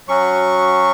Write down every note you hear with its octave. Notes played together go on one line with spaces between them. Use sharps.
F#3 C#4 F#4 C#6